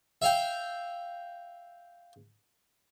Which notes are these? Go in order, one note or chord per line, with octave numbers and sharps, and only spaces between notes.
E5 F5 G5